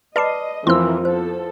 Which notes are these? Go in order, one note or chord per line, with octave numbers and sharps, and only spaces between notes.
B4 D5 D#5 A5 B5 D6 C7
F2 E3 E4 A#4 C5 C6 E6
F3 B3 A4 C5